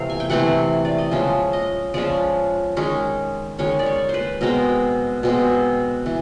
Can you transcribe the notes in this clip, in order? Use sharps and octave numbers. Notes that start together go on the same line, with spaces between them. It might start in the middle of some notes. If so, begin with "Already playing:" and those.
Already playing: C3 E3 A3 C4 F5
G#5
G5
C3 E3 A3 C4 F#5
D5
D#5
F3 G#3 C#4 E5
D#5
F3 G#3 C#4 D5
D#3 G#3 C#4
D#3 G#3 C#4 C#5
D5
C#5
C5
B4
B2 G#3 C4 A#4
B2 G#3 C4
E3